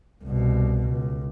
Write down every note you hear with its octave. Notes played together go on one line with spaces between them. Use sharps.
C2 B2
C#2